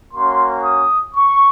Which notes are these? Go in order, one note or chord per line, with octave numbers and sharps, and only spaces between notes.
A#3 C#4 F#4 C6
D#6
C#6